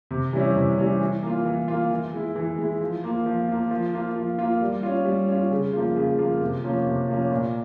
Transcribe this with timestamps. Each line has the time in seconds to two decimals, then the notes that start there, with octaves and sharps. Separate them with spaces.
0.11 C3
0.33 E3 G3 C#4 E4
0.55 C3
0.78 E3 G3 C#4 E4
1.01 E3
1.23 A#3 F4
1.45 E3
1.68 A#3 F4
1.91 E3
2.13 G#3 E4
2.36 E3
2.58 G#3 E4
2.81 F3
3.04 A#3 F4
3.26 F3
3.49 A#3 F4
3.71 F3
3.93 A#3 F4
4.16 F3
4.39 A#3 F4
4.61 G3
4.83 C#4 F4
5.05 G3
5.28 C#4 F4
5.51 C#3
5.73 F3 A#3 F4
5.96 C#3
6.18 F3 A#3 F4
6.41 C3
6.64 F3 A#3 C#4
6.86 C3
7.08 F3 A#3 C#4
7.31 A#2